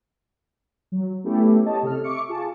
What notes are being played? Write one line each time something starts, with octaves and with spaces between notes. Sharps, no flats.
F#3
A3 B3 C#4 E4 G4 A4
G4 C#5 D#5 A5
C3 A4 F6
E5 C#6 D6 C#7
F4 G#4 A5